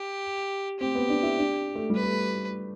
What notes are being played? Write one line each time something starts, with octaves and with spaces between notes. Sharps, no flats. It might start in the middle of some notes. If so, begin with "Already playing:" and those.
Already playing: G4
C4 G4
B3
D4
E4
D4
A3
G3
B4
A3